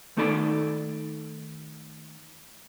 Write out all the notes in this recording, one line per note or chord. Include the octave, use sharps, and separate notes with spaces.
D#3 A3 D#4 A4 D5 B5